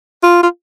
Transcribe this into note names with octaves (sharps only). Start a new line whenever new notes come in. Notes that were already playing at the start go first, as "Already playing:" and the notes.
F4
F4